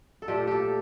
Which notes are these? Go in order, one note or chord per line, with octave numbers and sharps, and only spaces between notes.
A4
A#2 F3 A3 G4
G4 A4